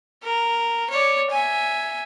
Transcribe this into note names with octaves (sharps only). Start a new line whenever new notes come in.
A#4
C#5 D5
E5 G#5